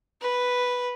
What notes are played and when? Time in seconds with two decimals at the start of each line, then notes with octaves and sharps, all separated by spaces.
0.21 B4